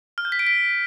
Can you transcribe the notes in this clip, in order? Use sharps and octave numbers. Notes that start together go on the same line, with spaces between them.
F6
G6
B6
D7
B6